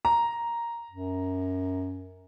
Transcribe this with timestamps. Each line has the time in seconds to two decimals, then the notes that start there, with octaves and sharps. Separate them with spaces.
0.05 A#5
0.90 F#2